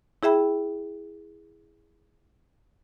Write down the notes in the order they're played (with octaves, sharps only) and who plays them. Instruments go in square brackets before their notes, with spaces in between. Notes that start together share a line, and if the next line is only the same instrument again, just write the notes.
[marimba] E4 G#4 E5 G5 B5